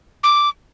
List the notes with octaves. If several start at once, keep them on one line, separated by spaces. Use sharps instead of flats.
D6